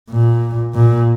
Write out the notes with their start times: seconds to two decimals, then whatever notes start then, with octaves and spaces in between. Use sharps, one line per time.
0.10 A#2
0.74 A#2